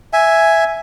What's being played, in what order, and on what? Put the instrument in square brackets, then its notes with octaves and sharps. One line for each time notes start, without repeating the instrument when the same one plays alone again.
[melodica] E5 G#5